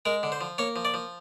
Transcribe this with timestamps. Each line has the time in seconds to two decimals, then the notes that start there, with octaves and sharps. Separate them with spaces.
0.05 G#3 A#4
0.23 D3
0.32 C5
0.41 F3
0.58 A#3 C#5
0.76 F3
0.85 D5
0.94 F3